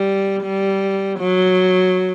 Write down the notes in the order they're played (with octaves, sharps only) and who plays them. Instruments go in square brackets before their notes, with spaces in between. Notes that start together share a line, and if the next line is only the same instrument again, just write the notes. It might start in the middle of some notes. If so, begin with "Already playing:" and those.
Already playing: [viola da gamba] G3
G3
F#3